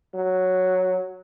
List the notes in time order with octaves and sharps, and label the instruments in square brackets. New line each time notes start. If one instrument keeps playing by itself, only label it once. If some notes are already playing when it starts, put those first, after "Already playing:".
[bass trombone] F#3